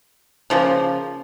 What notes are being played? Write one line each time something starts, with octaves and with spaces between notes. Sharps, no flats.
C#3 F3 A#3